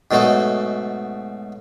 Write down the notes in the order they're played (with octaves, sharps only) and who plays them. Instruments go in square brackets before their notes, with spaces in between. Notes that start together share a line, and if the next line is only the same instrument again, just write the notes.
[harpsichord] G#2 B2 F#3 A3 D#4